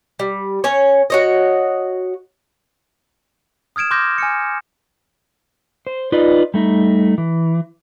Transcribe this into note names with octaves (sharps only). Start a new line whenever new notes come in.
G3
C#4 C#5
F#4 C#5 D#5
D#6 F6 G#6 D7 E7
C6 D6 F6 G6 A#6
G#5 F6 C#7
C5
D#4 F4 B4 D5 D#5
G3 A3 D#4
E3